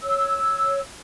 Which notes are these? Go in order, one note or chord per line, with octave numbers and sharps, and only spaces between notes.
C#5 E6